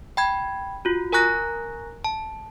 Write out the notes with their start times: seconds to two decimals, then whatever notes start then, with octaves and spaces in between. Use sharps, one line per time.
0.17 G5 B5 G#6
0.85 F4 F#4
1.12 A#4 G#5 A#5 C#6 F#6 A#6
2.04 A5